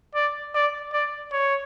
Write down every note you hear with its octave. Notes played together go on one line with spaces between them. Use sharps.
D5
D5
D5
C#5